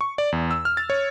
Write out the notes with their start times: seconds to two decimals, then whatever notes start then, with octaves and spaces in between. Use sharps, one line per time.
0.01 C#6
0.18 D5
0.32 E2
0.51 E6
0.65 F6
0.77 A6
0.90 C#5